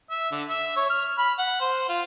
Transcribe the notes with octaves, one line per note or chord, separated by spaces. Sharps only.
E5
D3
E5
C#5
F6
B5
F#5
C5
F4